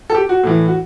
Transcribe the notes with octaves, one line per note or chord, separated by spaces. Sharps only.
A4
G4
F#4
A2 E3
F#4